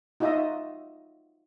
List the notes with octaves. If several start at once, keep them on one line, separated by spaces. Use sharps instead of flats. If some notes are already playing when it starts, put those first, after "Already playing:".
D#4 F4 F#4 D#5 E5 D#6